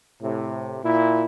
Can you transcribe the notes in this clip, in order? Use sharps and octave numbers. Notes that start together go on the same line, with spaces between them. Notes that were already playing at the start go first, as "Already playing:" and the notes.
A2 C3
A#2 E4